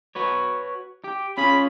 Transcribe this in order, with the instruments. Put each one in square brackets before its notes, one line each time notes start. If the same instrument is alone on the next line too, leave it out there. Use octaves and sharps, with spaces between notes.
[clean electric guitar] F#4 B4 C#5
G4
[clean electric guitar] C#4 F4 G#4 [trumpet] B5